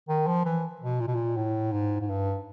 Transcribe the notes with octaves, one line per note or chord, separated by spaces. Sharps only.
D#3
F3
E3
B2
A#2
B2
A#2
A2
G#2
G#2
G2